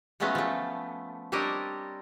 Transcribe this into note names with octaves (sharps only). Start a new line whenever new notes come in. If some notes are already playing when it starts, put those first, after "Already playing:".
F3 F#3 G#3 A3 B3 C#4
F3 A3
G3 C4 D4 A#4 C#5 D#5